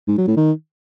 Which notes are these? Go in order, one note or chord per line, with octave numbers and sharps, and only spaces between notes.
G#2
F#3
A2
D#3